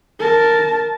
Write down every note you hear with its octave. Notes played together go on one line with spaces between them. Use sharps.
A#4 A5